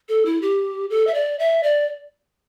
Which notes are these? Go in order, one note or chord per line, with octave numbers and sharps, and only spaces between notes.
A4
E4
G4
A4
E5
D5
E5
D5